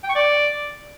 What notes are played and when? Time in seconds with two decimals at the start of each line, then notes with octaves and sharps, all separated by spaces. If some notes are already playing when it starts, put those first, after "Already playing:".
0.04 G5
0.09 C#6
0.15 D5